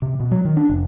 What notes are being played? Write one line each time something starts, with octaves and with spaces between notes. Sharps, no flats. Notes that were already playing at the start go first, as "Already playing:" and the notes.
C3
B2
F#3
D#3
D4
F1